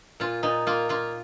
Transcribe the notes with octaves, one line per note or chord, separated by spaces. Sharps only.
A#2 F4
A#2 D#4
A#3 F4
A#3 F4